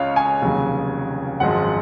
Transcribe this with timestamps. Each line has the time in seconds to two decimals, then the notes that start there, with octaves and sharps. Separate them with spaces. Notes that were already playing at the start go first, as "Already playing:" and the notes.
Already playing: C#2 C#3 G#3 C#5 F5
0.16 G#5
0.42 F1 D#2 C#3 F#3
1.40 G#1 F#2 F3 G#3 F#5